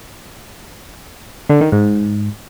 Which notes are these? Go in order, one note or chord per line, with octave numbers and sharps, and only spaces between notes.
D3
D#3
G#2